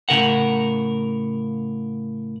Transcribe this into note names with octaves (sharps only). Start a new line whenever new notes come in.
A2 C#3 A#4 F#5